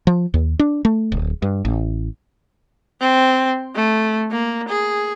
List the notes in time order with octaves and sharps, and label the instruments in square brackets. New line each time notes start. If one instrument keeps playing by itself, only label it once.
[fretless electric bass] F3
D#2
D4
A3
D1
G2
A1
[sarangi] C4
A3
A#3
G#4